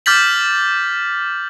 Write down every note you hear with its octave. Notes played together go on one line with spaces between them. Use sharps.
D6 F6 G6 A6 B6 F#7